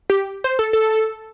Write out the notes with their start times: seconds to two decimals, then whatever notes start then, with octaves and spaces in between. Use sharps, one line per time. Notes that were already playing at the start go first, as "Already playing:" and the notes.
0.10 G4
0.44 C5
0.59 A4
0.73 A4